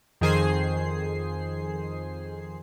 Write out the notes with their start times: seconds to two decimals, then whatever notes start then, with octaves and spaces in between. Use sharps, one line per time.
0.21 F2 D#3 G#4 C5 C7